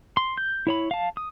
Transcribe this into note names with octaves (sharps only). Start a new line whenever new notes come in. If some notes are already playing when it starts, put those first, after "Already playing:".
C6
G6
E4 C#5 B5
F5 A5
D#6